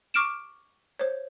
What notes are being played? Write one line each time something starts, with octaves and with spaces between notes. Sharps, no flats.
C#6 D6 F6 D7 E7
C5 C#5